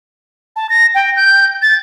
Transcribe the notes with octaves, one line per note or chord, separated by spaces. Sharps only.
A5
A#6
G5
G6
A6